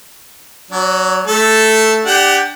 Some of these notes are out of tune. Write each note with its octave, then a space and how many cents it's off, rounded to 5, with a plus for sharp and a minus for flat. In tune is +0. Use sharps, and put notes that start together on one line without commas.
F#3 +5 D4 -40
A3 +0 A4 +0
D4 +0 G4 +10 F#5 +30